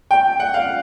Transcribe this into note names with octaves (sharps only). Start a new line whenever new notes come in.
G5
F#5
F5